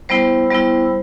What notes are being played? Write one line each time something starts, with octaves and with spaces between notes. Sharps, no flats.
G3 B3 E4 C5
G3 B3 E4